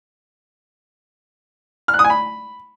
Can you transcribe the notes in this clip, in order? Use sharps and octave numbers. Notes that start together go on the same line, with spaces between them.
F6
F#6
D#6
G#5
B5